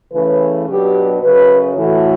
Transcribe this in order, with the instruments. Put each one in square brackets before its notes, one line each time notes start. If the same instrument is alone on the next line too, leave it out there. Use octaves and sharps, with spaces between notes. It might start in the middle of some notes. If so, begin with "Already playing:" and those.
[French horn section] C#3 E3 A3 C#4 B4
B2 F#3 B3 D4 G4
F#2 C#3 F#3 B4
A2 E3 A3 F#4